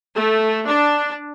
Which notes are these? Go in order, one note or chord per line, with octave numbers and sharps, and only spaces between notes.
A3
D4